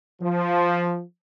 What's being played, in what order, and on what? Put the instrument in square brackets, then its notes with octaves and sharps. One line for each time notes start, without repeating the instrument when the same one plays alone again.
[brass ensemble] F3